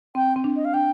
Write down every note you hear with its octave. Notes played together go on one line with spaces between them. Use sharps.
C4 G5
C4
D4
D#5
F5
D4 G5